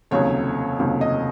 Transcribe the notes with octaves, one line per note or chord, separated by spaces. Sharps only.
F1 D#2 C#3 F#3 C#5
F1 D#2 C#3 F#3
D#5